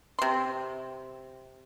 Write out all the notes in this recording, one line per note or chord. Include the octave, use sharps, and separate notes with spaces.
C3 C6